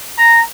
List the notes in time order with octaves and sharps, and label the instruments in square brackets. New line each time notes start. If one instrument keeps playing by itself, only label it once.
[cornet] A#5